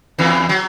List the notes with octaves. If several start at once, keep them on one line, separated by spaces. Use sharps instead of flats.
E2 E3
F#3